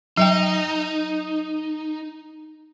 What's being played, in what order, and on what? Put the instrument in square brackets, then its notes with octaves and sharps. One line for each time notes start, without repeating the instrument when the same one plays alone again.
[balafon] F#3 E5 G5 [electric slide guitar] D#4